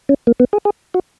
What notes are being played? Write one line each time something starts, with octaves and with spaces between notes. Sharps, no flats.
C#4
A#3
B3
G#4
G#4
F#4